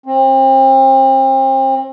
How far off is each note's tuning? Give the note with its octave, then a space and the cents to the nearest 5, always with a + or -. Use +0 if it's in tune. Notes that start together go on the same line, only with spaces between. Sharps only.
C4 +35